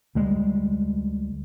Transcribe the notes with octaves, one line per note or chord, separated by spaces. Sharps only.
D2 G3 G#3